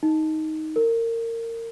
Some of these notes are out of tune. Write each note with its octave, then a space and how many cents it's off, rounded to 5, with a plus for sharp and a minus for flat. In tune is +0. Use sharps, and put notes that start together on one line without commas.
D#4 +10
A#4 -25